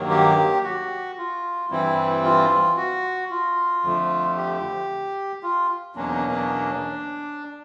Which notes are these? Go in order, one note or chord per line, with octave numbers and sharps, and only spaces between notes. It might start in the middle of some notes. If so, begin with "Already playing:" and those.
Already playing: G2 D#3 F#3 A#3
G4
F#4
F4
G2 E3 G3 C4 E4
F4
F#4
F4
F2 D3 F3 A3
G4
F4
E2 B2 F#3 A#3 C#4 D4
D#4
D4
D4